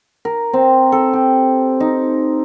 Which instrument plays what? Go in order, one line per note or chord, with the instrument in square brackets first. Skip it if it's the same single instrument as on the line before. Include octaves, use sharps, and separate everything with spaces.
[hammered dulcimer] A#4
C4
A4
G4
D#4